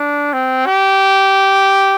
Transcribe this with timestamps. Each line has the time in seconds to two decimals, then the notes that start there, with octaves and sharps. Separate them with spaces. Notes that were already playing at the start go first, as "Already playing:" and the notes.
Already playing: D4
0.33 C4
0.66 G4